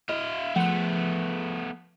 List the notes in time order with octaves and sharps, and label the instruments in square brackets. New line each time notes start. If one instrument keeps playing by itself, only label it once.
[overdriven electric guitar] E4 F5 [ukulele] D#5
[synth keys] F3 G#4 F#6 [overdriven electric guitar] A3 B3 [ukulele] F#5